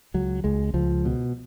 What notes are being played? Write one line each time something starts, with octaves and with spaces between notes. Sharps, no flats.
C#2 F#3
C#2 G#3
C#2 F3
B2